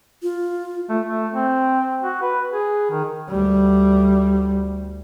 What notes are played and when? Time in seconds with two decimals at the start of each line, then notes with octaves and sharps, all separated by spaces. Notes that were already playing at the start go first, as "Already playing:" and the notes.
0.23 F4
0.89 A3
1.06 A3
1.33 C4
2.03 F#4
2.22 B4
2.52 G#4
2.91 D#3
3.29 D2 G3